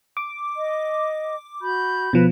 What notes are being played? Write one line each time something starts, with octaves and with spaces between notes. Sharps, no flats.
D6
D#5
F#4 B5 G6
B2 F3 B4